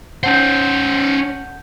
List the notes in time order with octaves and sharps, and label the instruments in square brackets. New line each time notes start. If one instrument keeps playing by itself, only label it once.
[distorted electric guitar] C#4 C5 [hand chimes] F#5 A5 G6